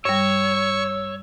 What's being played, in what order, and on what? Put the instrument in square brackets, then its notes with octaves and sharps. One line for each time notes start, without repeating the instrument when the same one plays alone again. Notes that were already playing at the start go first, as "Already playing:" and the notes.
[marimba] G2 G3 [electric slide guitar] C#5 [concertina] C#6 [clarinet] E6